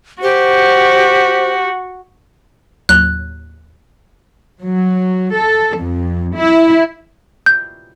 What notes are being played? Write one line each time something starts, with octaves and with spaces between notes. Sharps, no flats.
F#4 G4 C5
D#2 A2 F#3 F#6
F#3
A4
F2
E4
G6